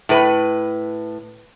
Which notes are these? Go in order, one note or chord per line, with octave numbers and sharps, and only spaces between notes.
A2 B4